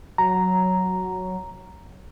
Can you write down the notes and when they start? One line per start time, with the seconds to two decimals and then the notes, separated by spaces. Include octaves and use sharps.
0.18 F#3 A#5